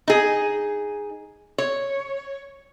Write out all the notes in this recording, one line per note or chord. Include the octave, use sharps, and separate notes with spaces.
D#4 G#4
C#5